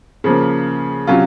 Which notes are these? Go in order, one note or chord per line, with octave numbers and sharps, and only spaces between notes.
C#3 F3 A#3
C3 F#3 C#4 F4